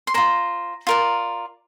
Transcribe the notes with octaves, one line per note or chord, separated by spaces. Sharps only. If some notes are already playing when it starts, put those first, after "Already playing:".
C6
F4 C5 A#5
F4 A#4 D5